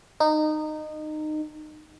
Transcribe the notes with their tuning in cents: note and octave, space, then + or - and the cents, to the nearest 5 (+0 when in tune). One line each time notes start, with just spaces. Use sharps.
D#4 -20